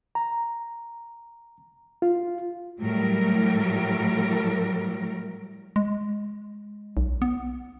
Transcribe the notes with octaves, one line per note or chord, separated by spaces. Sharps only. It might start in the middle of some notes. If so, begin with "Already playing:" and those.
A#5
F4
A2 F#3 G3 A#4
G#3
B1
B3